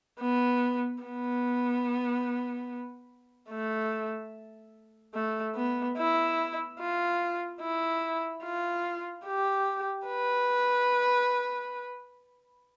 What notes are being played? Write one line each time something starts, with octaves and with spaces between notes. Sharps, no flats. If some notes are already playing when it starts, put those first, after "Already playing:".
B3
B3
A3
A3
B3
E4
F4
E4
F4
G4
B4